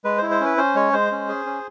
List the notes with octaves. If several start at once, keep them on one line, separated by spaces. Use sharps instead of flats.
G#3 B4
C5
E4
C5
C#4 B4
C#4 C5
G#3 C#5
G#3 C5
C#4
G#4
C#4